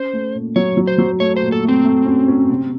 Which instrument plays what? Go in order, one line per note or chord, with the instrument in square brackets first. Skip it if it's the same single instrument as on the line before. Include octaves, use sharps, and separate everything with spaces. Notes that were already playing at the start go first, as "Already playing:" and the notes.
Already playing: [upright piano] C#4 [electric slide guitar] C5
[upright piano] A3
A#2
[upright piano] F#3 [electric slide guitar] C#5
[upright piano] F#3
[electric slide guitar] C5
[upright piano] F#3
[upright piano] A3 [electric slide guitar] C#5
[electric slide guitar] C5
[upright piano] A#2
[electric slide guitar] A4
[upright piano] A3 [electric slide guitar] C4
[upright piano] A3
C#4
C#4
C3